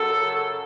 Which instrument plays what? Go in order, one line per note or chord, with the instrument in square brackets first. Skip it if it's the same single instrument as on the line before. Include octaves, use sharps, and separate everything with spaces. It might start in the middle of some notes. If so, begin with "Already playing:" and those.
Already playing: [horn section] F#2 C#3 F#3 A4